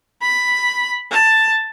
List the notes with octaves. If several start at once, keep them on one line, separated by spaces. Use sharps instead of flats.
B5
A5